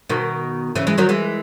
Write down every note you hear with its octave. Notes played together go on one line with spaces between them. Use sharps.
B2 D#3
C#3 E3
E3 G#3
D#3 F#3
E3 G#3